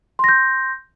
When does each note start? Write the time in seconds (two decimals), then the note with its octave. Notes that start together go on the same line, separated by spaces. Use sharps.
0.19 C6
0.24 A#6
0.29 G6